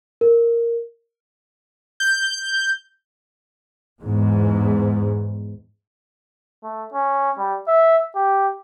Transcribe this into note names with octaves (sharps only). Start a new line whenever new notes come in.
A#4
G6
E2 G#2
A3
C#4
G3
E5
G4